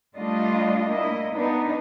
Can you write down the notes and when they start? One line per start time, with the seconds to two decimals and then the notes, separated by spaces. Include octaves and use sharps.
0.16 G3 A3 D4 F4 D#5
0.91 A#3 E4 D#5
1.34 B3 D4 D#4 B4